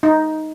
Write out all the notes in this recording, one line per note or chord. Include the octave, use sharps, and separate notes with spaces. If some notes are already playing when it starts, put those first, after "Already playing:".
D#4